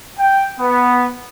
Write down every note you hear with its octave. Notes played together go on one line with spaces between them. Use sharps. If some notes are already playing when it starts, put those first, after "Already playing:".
G5
B3